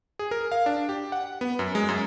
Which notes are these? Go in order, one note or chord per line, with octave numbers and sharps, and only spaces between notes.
G#4
A#4
F5
D4
G4
F#5
B3
F#2
G#3
F#2